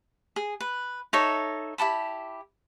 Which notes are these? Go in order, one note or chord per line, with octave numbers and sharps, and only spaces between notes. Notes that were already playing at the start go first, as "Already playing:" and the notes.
G#4
B4
D#4 A4 C#5 E5
E4 G4 A5 B5